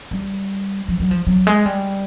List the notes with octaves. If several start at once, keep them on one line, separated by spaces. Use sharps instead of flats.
G3
F3
F#3
F3
F#3
G#3
G3